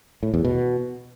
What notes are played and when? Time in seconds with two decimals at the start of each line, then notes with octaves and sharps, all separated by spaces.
0.23 A2
0.34 E2
0.45 B2